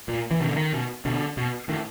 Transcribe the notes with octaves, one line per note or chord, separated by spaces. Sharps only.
A#2
E3
B2 D#3
D3
D#3
B2
B2 D3
B2
A2 D#3